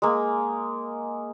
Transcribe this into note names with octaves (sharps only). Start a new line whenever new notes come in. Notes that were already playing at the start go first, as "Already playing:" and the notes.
G#3 A#3